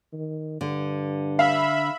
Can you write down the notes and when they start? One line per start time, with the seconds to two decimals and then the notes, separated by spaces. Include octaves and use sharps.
0.13 D#3
0.61 G2 D3
1.39 E5 F5 B5